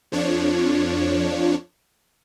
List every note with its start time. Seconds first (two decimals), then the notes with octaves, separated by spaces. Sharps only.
0.12 F2 F3 D4 C#5